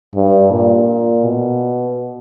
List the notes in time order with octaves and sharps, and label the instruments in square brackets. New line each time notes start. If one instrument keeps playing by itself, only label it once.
[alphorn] G2
A#2
B2